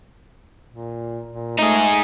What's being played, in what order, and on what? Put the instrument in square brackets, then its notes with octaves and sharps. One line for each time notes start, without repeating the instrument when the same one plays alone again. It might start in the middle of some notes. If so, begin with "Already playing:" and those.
[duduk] A#2
A#2
[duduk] A3 [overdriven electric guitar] D#4 G#4